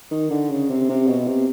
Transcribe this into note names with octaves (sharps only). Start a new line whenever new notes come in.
D#3
D3
C#3
C3
C3
B2
C3